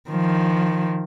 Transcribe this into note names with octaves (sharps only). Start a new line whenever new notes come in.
D#3 F3